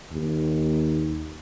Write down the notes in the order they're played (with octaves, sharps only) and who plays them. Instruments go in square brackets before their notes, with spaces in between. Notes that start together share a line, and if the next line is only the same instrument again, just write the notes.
[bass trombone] D#2